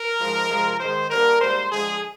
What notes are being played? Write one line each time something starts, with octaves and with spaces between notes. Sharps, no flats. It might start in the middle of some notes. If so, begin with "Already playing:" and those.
Already playing: A#4
G#2 F3 G#3
C3 F3 G#3
G#2 D#3 G#3 C5
D3 G3 A#3 A#4
G#2 G3 A#3 C5
D3 F3 G#3 G#4